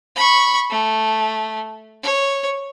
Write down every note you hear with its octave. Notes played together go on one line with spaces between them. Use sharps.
B5 C#6
A3
C#5